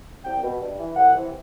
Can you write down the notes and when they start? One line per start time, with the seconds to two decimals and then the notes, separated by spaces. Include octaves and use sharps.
0.25 C2 G5
0.43 B2
0.60 G2
0.78 E3
0.97 C2 F#5
1.14 C3 E3